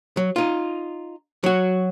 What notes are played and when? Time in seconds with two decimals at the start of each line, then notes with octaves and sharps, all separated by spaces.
0.17 F#3
0.36 D#4 F4
1.44 F#3 F#4